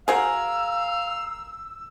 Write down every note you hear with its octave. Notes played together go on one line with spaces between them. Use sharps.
F#4 G#4 A#4 C5 F5 G#5 E6